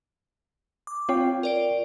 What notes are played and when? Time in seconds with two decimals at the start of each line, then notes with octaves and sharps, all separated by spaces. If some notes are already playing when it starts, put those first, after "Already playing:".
0.87 D6
1.09 C4 F4 C#5 G5
1.43 A#4 D5 D7